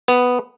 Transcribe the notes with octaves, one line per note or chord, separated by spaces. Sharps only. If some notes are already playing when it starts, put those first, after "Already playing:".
B3